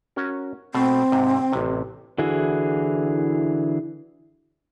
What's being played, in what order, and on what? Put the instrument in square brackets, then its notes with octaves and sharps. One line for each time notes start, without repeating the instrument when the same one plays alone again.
[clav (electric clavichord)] C#4 F#4 A#4
[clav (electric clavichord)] B2 A3 C5 [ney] C4
[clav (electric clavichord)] G#2 C3
A1 C3
[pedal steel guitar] D3 E3 E4 F#4 G#4